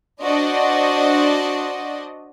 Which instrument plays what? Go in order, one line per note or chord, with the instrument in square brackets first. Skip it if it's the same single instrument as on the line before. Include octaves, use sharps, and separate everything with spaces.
[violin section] D4 F#4 C5 D5 D#5